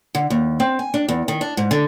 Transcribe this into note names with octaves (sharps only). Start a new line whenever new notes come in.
D3
D#2
C4
G#5
D4
E2
D#3
D4
G#2
D3